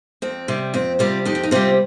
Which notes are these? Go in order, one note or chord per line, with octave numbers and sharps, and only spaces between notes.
F2 C4
C3 G3
F2 C4
C3 G3 C4 F4
F2 D#4 G4
C4
D#4
C3 G3 C4 F4